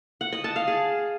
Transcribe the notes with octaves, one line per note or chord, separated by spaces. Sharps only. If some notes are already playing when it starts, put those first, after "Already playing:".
F#5
D#5
A5
F5
G#4